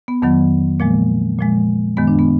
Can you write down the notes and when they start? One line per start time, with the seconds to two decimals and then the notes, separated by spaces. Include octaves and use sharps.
0.08 B3
0.22 F2 D#3 F#3 B3
0.80 A#2 F3 G#3 A#3
1.39 A#2 F3 G#3
1.97 F#2 D#3 G#3 B3
2.07 D4
2.19 B3